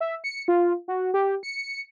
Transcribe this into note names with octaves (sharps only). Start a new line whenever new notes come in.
E5
C#7
F4
F#4
G4
C#7